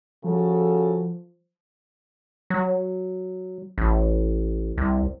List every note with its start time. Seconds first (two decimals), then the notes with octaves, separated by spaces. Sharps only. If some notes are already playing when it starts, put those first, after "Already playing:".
0.24 C#3 F3 F#4 A4
2.50 F#3
3.78 A1
4.78 C2